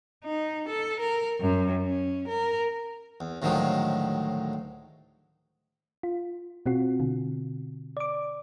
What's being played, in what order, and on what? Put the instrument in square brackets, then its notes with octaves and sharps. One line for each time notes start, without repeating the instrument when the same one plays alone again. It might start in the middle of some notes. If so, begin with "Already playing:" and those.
[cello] D#4
A4
A#4
F#2
C#4
A#4
[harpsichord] E2
D2 A2 D#3 F3 F#3 G#3
[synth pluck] F4
B2 C4 F4 F#4
B2 D3
D5 D6